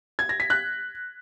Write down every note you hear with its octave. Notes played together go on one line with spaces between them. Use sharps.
G#6
A#6
B6
F#6